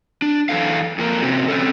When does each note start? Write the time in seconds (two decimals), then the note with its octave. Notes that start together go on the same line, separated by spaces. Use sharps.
0.22 D4
0.49 F#2 D#3 E3 A4 F5
0.98 F2 A#3 A#4
1.22 C3 C4 C#4 F#4
1.48 C4 C#4 A4